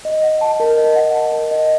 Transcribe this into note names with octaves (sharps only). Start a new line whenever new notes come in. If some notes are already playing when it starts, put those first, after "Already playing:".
D#5
F#5
A5
A#4
D#5
F#5
A5
A#4
D#5